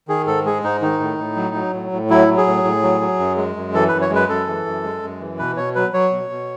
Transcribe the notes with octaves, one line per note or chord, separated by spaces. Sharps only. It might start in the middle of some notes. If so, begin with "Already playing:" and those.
D#3 G#4
G#2 A4
G#3 G#4
G#2 D#4
D#3 D#4
A2
A2
F#3
F#3
A2
A2
F#3 E4
F#3
G#4
A2
A2
F#3
F#3
F#2
G#3
F#2
E3 A4
F#2 B4
C#5
G#3
B4
F#2 A4
E3
F#2
G#3
F#2
E3
B2 B4
B2 C#5
F#3 B4
F#3 C#5
B2
B2